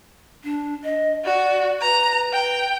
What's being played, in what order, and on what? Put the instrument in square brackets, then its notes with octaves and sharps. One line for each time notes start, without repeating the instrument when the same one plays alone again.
[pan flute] D4
D#5
[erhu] F#4 [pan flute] D5
[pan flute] B4 [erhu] A#5
[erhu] G5